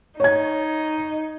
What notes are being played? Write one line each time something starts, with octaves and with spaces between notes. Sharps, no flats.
D#4 C#5 G#6